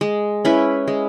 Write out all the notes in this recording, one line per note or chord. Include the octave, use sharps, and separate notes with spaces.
G#3
C#4 E4 B4
G#3